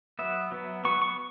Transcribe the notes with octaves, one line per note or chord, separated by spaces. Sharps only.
F#3 B3 E5
F#3 B3
F#3 B3 C#6
C#6